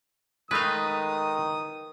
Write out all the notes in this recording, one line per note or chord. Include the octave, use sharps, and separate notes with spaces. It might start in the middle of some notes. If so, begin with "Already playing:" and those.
D#3 G#3 A3 B4 D#5 F5 D#6